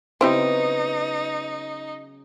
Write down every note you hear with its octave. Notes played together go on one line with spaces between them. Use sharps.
C#3 F#3 B3 C4 D#4 E4 G4